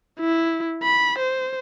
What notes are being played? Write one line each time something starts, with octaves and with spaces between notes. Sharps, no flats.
E4
B5
C5